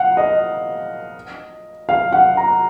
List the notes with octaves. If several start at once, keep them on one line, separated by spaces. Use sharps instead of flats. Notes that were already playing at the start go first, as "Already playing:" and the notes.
Already playing: F5 F#5
D#5
F5
F#5
A#5